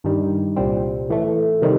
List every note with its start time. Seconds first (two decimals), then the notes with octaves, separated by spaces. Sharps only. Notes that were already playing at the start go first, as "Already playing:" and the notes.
0.04 G2 D#3 G3
0.56 C2 A#2 G3 C4
1.09 A2 E3 A3
1.62 C3 D#3 G3